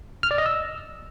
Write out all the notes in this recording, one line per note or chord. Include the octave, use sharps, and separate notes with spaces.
F6
D5
D#5
E6